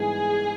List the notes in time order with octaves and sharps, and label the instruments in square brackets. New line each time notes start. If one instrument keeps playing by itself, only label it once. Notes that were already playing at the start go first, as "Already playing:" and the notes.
Already playing: [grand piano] G#2 E3 G3 B3 [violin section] G#4